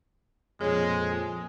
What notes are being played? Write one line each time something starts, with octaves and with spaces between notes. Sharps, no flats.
F2 A#2 G#3 A#3 G#4 C#5
F4 G#5